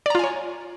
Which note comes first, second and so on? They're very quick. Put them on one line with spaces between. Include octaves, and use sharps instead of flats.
D5 A#5 F4 G#5 C#5